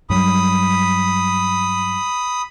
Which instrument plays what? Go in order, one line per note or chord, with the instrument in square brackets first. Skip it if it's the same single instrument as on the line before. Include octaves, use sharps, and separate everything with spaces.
[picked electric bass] G2 F#3 G3 [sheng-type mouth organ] B5 D#6